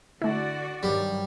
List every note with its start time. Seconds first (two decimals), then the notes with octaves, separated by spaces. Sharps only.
0.22 D3 A3 E4 F#4 D5
0.83 G2 D#3 F#3 G3